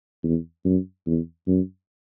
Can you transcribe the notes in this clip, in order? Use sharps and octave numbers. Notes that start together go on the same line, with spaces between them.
E2
F#2
E2
F#2